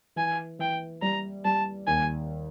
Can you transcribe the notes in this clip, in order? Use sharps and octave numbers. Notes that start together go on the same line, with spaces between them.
E3 G#5
E3 G5
G3 A#5
G3 A5
D#2 G#5